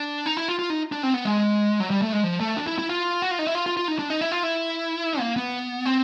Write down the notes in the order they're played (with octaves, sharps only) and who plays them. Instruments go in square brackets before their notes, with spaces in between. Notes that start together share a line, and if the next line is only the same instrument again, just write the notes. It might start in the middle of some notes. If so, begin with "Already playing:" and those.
Already playing: [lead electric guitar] D4
D#4
E4
F4
F4
D#4
D4
C4
B3
G#3
F#3
G3
A3
G#3
F3
A3
D4
E4
E4
F4
F#4
F4
D#4
E4
F4
F4
F4
D#4
D4
D#4
E4
F4
E4
A#3
B3
C4